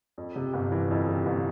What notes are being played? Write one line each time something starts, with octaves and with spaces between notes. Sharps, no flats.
F2
C3
G1
E3
F2
C3
G1